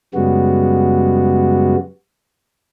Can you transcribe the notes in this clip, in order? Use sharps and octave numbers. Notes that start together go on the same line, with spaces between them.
F#2 C#3 G3 G#3 B3 F#4